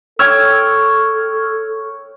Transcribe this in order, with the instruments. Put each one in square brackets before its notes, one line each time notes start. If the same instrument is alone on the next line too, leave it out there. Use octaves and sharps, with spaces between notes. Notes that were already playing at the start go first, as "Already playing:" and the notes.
[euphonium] A4 [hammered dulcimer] C#5 G5 [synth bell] E6 F6 G#6